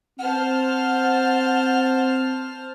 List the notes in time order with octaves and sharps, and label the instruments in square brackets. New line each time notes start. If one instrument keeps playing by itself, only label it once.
[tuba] C4 [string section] C5 A5 F6 [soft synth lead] F#5